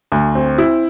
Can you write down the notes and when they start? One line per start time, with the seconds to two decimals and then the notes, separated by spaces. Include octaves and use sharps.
0.12 D2
0.35 C4
0.58 E4